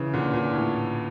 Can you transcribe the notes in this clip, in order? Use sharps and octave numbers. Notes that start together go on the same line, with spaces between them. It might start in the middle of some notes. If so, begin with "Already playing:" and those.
Already playing: C#3 E3
A#2 D3
A#2
A2